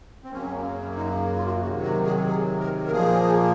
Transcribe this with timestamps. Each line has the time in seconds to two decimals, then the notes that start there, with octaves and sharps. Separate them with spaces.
0.24 C4
0.32 F#2 C#3 F#3 A#3 C#4
0.97 D#4
1.36 F4
1.46 F#4
1.61 C3 D#3 F#3 F#4
1.83 F#4
2.05 G#4
2.26 G#4
2.60 A#4
2.86 A#4
2.92 A#2 F3 A#3 G#4